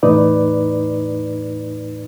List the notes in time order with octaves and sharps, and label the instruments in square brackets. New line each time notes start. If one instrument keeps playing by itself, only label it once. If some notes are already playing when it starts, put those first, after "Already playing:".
[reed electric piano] E2 A2 D#4 B4 D5